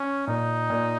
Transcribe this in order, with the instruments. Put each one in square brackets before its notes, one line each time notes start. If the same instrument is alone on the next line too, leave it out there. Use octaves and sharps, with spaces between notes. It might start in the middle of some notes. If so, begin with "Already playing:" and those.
Already playing: [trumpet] C#4
[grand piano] A#2 [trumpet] D#4
[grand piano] A#2